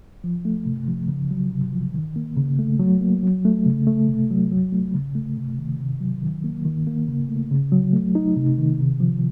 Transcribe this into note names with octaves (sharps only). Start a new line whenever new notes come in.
F3
A3
C3
F3
C#3
F#3
C3
F3
D#3
A#3
C#3
A3
F#3
A#3
F#3
A3
C#3
A3
C3
F#3
F#3
A3
C#3
A3
C3
D#3
C3
F#3
D#3
A#3
D#3
A#3
C#3
A3
C#3
F#3
A3
D#4
C3
D#3
C3
F3